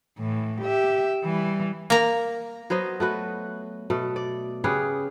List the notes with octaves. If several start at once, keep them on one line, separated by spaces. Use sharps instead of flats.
A2 E3
G4 E5
E3 G3
A#3 A#5
F#3 B3 C5 D#5
A3 F#4 B4
B2 A3
D5
C#3 G4 G#4 B4